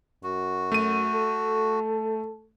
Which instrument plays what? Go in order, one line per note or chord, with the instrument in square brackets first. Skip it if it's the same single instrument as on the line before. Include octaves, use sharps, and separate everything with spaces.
[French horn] F#2 [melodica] F#4
[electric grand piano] A3 D#7
[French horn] A4